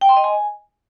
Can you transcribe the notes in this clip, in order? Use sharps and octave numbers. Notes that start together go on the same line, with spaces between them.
G5
C6
D#5
G#5